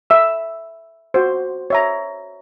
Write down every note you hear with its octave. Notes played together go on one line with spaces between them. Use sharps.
E5 E6
F#4 C5
C#5 E5 A#5